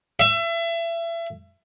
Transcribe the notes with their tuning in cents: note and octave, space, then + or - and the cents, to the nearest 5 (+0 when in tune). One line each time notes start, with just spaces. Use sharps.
E5 +30